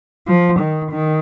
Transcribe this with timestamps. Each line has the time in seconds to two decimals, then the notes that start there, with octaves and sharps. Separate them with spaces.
0.28 F3
0.60 D#3
0.91 D#3